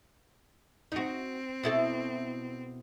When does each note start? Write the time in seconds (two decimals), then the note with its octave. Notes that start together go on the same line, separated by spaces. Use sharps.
0.92 C4 D#4 F#4
1.63 B2 E4 A4